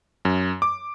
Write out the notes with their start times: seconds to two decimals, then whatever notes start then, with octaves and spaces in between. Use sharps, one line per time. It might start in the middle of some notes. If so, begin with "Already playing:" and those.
0.25 F#2
0.62 D6